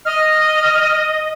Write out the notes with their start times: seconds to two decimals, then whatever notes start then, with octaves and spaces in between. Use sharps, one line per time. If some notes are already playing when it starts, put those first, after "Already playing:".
0.05 D#5 F6